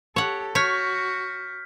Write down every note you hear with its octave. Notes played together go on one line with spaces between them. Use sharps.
G4 A4 C#5 F#5
F#4 C#5 F6 G6 B6